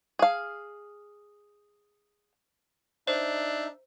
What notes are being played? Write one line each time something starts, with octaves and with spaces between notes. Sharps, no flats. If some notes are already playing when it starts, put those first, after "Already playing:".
G#4 F5
D4 D#4 C5 E5